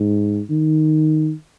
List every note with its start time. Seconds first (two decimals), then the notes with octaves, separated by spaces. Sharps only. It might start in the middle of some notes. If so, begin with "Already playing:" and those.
Already playing: G#2
0.50 D#3